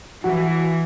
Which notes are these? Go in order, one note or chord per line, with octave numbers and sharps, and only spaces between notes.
E3 F#4